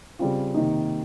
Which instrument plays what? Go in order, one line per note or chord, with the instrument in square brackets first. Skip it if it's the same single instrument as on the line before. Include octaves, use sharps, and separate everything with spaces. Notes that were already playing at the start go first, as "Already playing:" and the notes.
[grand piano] C#3 G3 C4 F4
C3 D#3 A#3 D#4